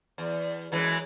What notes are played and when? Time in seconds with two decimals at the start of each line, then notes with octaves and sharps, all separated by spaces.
0.18 E2
0.72 F#2 E3 G#3